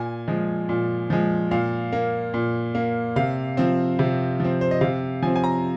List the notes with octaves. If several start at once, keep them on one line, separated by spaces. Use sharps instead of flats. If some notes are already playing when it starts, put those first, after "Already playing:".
Already playing: A#2 G#5
F3 G#3
A#2
F3 G#3
A#2 F5
A#3
A#2
A#3
C3 F5
F3 C4
C3
F3 C4
C5
D#5
C3 F5
F3 C4 G#5
G#5
A#5